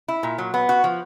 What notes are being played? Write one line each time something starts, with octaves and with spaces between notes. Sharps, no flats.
E4
A#2
F#3
B3
F#4
F3